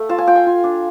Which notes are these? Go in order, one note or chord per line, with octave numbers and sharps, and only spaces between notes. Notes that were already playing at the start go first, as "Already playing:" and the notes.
Already playing: A3
F4 A5
G#5
F4 G5
G#5
F4
D4